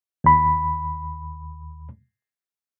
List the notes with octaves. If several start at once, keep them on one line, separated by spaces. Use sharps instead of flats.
D#2 B5